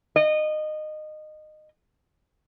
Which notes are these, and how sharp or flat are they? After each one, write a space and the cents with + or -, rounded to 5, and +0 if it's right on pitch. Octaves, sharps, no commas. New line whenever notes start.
D#5 -20